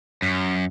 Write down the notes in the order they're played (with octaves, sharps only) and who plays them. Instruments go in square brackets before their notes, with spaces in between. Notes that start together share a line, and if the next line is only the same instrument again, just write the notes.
[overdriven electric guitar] F#2